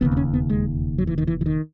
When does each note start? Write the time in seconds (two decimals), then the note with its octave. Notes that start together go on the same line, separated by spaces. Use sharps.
0.01 E1 D#2 C#3 B3
0.12 B3
0.17 C#4
0.34 B3
0.49 G#3
0.98 F#3
1.07 E3
1.18 D#3
1.27 E3
1.41 E3
1.46 D#3